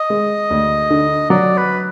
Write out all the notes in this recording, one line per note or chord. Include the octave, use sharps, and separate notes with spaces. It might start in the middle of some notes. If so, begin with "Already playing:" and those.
Already playing: D#5
G#3
D2
D3
F#3 D5
B4